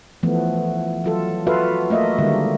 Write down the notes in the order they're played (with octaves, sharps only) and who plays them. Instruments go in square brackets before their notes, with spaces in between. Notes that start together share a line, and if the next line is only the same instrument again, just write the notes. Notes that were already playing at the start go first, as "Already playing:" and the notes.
[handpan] E3 F3 A3 B3
F#3 F4 A4
F4 F#4 A4 B4 E5 F5
A3 A#3 D#5 E5
D3 D#3 G3 G#3 A#3